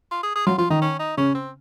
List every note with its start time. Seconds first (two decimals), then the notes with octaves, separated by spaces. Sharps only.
0.11 F4
0.23 G#4
0.35 G#4
0.46 F#3 F4
0.58 F3 F4
0.70 D#3 D#4
0.82 C#4
0.99 D#4
1.17 C#3 C#4
1.35 C4